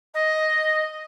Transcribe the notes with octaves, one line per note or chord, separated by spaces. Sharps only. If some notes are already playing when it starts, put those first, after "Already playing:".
D#5